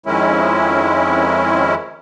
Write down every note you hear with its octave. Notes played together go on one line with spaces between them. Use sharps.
F2 D#3 G#3 C#4 E4